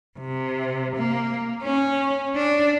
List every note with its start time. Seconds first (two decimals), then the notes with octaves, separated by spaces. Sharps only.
0.19 C3
0.97 A#3
1.63 C#4
2.36 D4